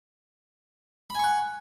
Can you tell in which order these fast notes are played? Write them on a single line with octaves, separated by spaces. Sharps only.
B5 G#5 C#6 F#5